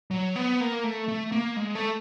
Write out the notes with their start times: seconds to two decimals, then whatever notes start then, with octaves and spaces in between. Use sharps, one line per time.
0.11 F#3
0.36 B3
0.60 A#3
0.84 A3
1.08 A3
1.32 A#3
1.56 G#3
1.75 A3